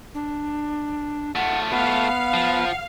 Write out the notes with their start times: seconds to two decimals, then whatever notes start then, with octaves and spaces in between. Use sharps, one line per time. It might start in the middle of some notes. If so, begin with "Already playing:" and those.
0.14 D4
1.35 A3 F4 F#5
1.72 B3 F5 F#5
2.34 F3